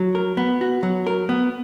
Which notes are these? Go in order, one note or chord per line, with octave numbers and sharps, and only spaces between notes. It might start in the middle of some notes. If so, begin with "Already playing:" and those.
Already playing: F#3
A#4
B3
F#4
F#3
A#4
B3